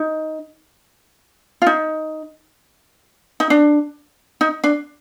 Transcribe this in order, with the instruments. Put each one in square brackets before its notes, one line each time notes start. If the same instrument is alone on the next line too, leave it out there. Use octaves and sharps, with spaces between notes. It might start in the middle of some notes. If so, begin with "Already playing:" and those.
Already playing: [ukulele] D#4
F4
D#4
D#4
D4
D#4
D4